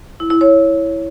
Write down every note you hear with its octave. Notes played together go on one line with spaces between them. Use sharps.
E4
E4
C#5